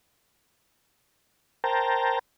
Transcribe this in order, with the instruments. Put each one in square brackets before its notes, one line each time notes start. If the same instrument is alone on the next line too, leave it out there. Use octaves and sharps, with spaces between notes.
[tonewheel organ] A#4 C5 G5 A5 A#5